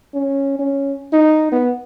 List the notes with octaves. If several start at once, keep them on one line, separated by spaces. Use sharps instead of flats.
C#4
C#4
D#4
B3